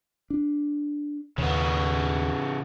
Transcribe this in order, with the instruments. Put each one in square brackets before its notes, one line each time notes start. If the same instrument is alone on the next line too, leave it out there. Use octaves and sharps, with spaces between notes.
[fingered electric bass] D4
[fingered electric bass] D#2 [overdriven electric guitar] C#3 B3